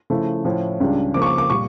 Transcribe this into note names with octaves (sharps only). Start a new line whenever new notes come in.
C#3 F3 A3 E4
A2 F3 C#4 E4
C#2 C#3 G3 D4
C#3 F3 A#3 D6
C#6
D6
D6
A#2 G3 C#6